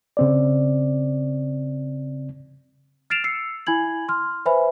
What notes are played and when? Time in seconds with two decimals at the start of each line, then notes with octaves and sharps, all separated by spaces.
0.17 C#3 C4 D5
3.10 F6 A6 C7 D7 E7 F7
3.24 E6 C7 C#7
3.67 E4 G#5 B5 G#6 F#7
4.08 C6 F6
4.46 B4 C5 E5 G#5 B5